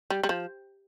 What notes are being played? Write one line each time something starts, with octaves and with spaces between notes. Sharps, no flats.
G3
G3
F3